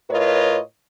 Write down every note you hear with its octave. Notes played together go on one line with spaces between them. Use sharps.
A2 F4 A#4 B4 C#5 D#5